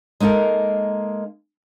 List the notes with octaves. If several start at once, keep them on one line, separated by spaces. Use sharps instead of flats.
G#3 A#3 D#4 A4 A#4